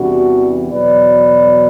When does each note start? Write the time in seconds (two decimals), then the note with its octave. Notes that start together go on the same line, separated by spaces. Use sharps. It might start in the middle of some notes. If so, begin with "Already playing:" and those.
Already playing: E2 C3 E3 G3 D4 F#4
0.71 E2 B2 F#3 B4 D5